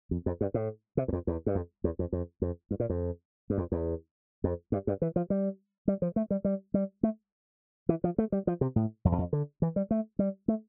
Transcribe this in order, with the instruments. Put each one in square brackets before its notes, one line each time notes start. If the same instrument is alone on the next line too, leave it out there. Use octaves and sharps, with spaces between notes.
[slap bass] F2
F2
G2
A2
C3
E2
F2
E2
G2
F2
E2
F2
F2
F2
G2
A#2
F2
G2
F2
E2
F2
G2
G2
E3
F3
G3
G3
F3
A3
G3
G3
G3
A3
E3
F3
A3
G3
F3
C3
A2
F2
E2
F2
D3
E3
G3
A3
G3
A3